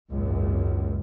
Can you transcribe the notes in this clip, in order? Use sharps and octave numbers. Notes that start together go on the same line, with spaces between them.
G#1 C#2 F#2 A#2